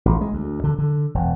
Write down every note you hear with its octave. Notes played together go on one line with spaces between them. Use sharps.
A1
G#3
D2
D3
D3
E1